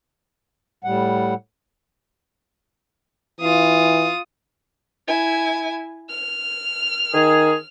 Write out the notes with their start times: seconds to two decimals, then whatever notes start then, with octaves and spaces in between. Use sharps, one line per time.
0.84 A2 G3 F#5
3.41 E3 F4 D#6
5.08 E4 G#5
6.10 F6
7.14 D#3 G#4